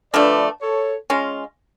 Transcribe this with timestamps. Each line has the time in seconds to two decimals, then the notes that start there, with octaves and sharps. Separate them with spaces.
0.14 D3 F3 A3 D4 B4 D5
0.62 A4 C#5
1.10 G#3 C#4 F4